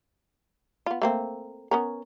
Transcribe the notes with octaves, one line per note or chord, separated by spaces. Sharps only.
B3 F4
A3 A#3 C4
B3 C#4 A#4